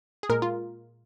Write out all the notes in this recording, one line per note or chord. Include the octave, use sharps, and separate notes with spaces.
G#4
A#2 G#3 A#4
F4